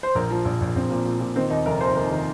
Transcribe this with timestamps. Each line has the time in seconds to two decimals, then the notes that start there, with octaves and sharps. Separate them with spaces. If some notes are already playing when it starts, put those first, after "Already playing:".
0.03 C5
0.15 A#1 A#4
0.31 F3
0.45 A#1
0.61 A#1
0.75 A#1 C4
0.90 A#2
1.05 A#2
1.20 A#2
1.36 D#3 C4
1.50 D#2 D#4
1.66 F1 A#4
1.80 D#2 C5
1.95 D#2 A#4
2.11 D#3